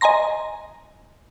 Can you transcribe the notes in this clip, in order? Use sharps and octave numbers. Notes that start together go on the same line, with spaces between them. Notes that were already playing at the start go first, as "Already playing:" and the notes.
D#5 G#5 A#5 C6 A#6